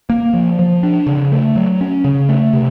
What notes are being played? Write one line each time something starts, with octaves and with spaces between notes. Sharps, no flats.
A#3
F3
F3
D4
C#3
A3
F#3
C#4
C#3
A3
C3